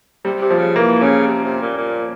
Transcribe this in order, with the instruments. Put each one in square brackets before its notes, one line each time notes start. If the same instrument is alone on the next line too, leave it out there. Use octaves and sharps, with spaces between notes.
[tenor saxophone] C3 [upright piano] G3
[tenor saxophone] C3
[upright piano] F3
[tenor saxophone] C#3
[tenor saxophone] E3 [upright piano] A#3
[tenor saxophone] C#3 [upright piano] C#4
[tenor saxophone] C3
C3
A#2
A#2